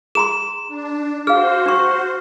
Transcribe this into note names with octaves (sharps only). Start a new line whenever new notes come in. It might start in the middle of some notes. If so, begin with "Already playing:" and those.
G#4 A#5 C6 E7
D4
F#4 G#4 C5 F5 F6
D4 C#6